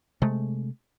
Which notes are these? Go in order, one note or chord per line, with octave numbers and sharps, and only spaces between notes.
C3 G#3 A3